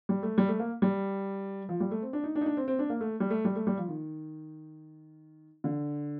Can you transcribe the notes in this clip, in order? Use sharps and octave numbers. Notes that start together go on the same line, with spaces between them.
G3
A3
G3
A3
A#3
G3
F3
G3
A3
C4
D4
D#4
D4
D#4
D4
C4
C4
D4
A#3
A3
G3
A3
G3
A3
G3
F3
D#3
D3